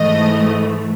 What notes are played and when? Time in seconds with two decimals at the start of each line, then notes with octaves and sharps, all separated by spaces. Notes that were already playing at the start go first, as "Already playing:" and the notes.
Already playing: G#2 E3 A3 D#5